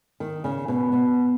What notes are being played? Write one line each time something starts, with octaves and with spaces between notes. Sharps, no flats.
D#3
C#3
B2
B2